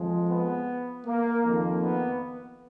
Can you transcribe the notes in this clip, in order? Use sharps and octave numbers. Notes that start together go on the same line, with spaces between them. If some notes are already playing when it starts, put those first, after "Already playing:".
Already playing: F2 F3 G#3
B3
A#3
F2 D#3 A#3
B3